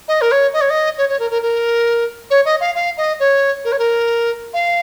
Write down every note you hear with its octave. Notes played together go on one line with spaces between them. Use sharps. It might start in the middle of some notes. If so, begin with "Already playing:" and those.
D#5
A#4
C#5
D#5
C#5
D#5
C#5
C#5
A#4
A#4
A#4
C#5
D#5
F5
F5
D#5
C#5
A#4
C#5
A#4
F5